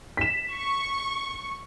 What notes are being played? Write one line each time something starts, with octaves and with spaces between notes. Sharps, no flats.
B6 E7
C#6